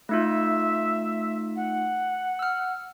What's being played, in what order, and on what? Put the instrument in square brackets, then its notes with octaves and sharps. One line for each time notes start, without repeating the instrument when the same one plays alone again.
[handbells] A3 D#4 F4 [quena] E5
[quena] F#5
[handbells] E6 F6